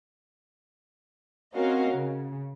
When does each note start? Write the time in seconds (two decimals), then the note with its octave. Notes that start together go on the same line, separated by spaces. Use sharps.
1.54 C4 C#4 F#4 A#4 D#5 F5
1.91 C#3